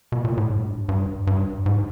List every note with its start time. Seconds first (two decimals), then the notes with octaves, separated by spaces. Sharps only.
0.12 B2
0.25 A#2
0.37 A2
0.49 G2
0.89 G2
1.27 G2
1.66 G#2